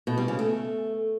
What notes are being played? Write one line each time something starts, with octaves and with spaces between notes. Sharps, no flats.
B2
G3
C#3
A3